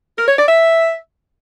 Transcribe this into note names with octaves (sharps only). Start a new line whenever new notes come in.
A#4
C#5
D5
E5